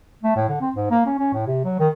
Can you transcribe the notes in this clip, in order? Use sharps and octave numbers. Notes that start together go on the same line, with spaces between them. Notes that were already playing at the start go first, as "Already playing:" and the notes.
A3
A2
D3
C4
G#2
A#3
C#4
C#4
A2
C3
F#3
D#3